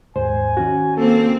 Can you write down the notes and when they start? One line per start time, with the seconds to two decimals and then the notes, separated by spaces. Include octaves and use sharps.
0.16 D#2 G#2 C5 G#5
0.57 D#3 C#4 F#4
0.97 A#3 C4 A4